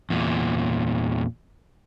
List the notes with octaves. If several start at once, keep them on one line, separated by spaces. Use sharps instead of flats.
E2 A#2